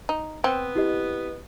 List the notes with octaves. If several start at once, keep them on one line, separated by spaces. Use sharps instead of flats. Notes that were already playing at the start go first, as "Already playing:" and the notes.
D#4
B3 C4
E4 G4 D#5